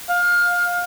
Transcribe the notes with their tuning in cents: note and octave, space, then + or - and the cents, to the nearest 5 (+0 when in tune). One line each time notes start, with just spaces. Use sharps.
F5 +20